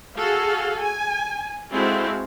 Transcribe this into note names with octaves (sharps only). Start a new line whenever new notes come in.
F#4 G#4 A4 F5
G#5
G#3 C4 E4 F#4 A4 F5